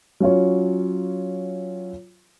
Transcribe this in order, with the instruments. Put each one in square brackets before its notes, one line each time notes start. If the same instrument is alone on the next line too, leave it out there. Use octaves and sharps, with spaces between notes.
[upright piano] F#3 C#4 F4 C#5